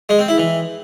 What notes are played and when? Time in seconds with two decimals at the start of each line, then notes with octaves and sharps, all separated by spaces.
0.09 G#3
0.19 C4
0.28 E4
0.38 E3